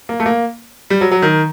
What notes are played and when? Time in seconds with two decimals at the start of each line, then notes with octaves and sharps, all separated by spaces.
0.09 A#3
0.20 A3
0.26 A#3
0.90 G3
1.01 F#3
1.11 F#3
1.22 D#3